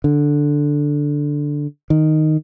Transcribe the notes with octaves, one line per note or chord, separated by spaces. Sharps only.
D3
D#3